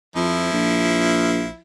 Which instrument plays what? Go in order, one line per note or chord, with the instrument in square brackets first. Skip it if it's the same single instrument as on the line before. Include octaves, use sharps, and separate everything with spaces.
[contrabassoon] F2 [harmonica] F3 E4
[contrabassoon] A#1